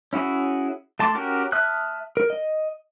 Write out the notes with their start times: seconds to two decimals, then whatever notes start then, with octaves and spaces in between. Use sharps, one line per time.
0.13 C#4 E4 F#4 G#4
0.99 A3 A5 C6 D6
1.15 C#4 F#4 G4 A#4
1.52 E5 A5 D#6 F6 F#6
2.17 A#4
2.30 D#5